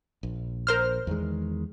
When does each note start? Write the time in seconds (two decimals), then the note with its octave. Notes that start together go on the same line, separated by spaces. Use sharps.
0.23 A#1
0.67 A#4 C5 F6
1.07 E2 D#3 G#3